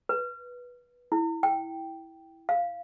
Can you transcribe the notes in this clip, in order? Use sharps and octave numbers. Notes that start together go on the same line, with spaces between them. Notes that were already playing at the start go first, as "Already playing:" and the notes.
B4
E4
G5
F5